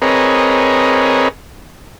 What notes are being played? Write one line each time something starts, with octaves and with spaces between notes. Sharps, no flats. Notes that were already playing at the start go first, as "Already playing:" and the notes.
C4 G#4 A#4 B4 C#5 D#5